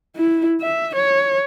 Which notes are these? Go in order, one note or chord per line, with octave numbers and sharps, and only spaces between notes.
E4
E5
C#5